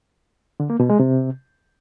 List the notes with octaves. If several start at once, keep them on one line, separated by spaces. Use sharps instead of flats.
D3
A#3
B2
G#3
C3